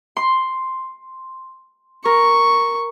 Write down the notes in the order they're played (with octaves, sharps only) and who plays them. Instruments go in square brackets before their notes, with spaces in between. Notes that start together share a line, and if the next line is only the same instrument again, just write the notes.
[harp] C6
[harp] A#4 [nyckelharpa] C#6